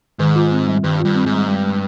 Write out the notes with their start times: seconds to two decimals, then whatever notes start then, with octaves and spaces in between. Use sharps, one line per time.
0.19 G#2 D#3
0.35 F4
0.52 C4
0.68 G3
0.84 G2 D#3
1.00 F4
1.05 G2
1.15 C4
1.26 G#2
1.32 G3
1.47 G2 G#3
1.63 G#3